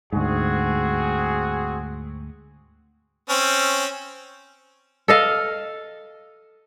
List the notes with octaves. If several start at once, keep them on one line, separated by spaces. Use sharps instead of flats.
D2 G#2 C4 F#4 G#4
C4 C#4
A4 D#5 F5